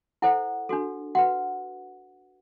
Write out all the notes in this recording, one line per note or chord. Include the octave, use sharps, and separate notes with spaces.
E4 A4 C5 F#5
D4 F#4 A4
F#4 B4 F#5